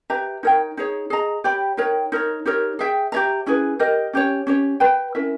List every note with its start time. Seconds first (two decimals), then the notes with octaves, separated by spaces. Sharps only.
0.10 G4 B4 E5 A#5
0.43 D#4 A#4 C#5 G5
0.77 D#4 G#4 C#5
1.10 G#4 D#5 A#5
1.44 G4 C#5 G5 B5
1.77 D#4 A#4 C#5 G5
2.12 D#4 A#4 C#5
2.45 D#4 G4 A#4 C#5
2.79 G#4 C#5 E5 G5
3.12 G4 C#5 E5 A#5
3.46 C#4 E4 G#4 B4
3.79 G4 A#4 D#5
4.13 C#4 G4 C#5
4.47 C#4 G4 C#5
4.80 B4 G5 B5
5.15 C#4 E4 A#4 E5